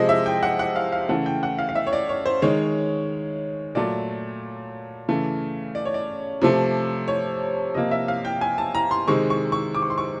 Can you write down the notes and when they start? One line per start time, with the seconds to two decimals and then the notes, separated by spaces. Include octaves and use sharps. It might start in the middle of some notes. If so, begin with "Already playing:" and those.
Already playing: C3 F3 G#3 D#5
0.09 E5
0.26 G5
0.43 F#5
0.59 F#5
0.76 F5
0.92 F5
1.09 C#3 E3 A3 F#5
1.26 G5
1.43 F#5
1.59 F5
1.69 F5
1.75 E5
1.87 C#5
1.93 D5
2.09 C#5
2.26 C5
2.42 D#3 G#3 C#5
3.75 A#2 F#3 A3 D5
5.08 C#3 E3 A3
5.75 D5
5.85 C#5
5.94 D5
6.42 C3 F3 A3
7.08 C#5
7.74 C3 F3 A#3 D#5
7.91 E5
8.08 F5
8.25 G5
8.41 G#5
8.58 A5
8.75 A#5
8.91 C6
9.08 C3 D#3 G#3 C#6
9.30 C#6
9.52 C#6
9.75 D6
9.82 C#6
9.90 C6
9.98 C#6